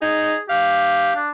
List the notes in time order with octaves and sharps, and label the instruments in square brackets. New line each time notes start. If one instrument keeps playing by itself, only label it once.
[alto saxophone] D#4 [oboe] G#4
[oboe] G4 [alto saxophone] F5
[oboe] D4